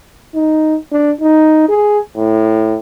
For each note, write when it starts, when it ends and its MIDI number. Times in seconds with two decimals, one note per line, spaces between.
0.35 0.75 63
0.92 1.12 62
1.21 1.64 63
1.69 1.99 68
2.17 2.77 45